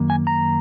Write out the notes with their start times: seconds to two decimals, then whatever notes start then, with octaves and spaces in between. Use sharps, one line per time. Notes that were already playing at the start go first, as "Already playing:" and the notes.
Already playing: F#2 D#3 A#3
0.10 G#5
0.27 A#5